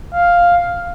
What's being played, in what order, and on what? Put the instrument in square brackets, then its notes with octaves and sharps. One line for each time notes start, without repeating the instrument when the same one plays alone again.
[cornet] F5